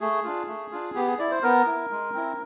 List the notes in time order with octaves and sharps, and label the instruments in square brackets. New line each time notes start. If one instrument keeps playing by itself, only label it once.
[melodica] A3 G#4
D4 F4
A3
D4 F4
B3 G4
G#4
E4 D5
C5
B3 A#4
E4
G#3
C4 E4